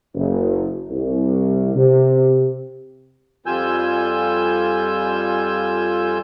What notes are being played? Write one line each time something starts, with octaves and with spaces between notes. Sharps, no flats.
F#1
C2
C3
F2 G3 F4 G#5 E6 G6